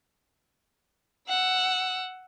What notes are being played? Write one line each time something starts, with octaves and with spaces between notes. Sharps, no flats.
F#5 E6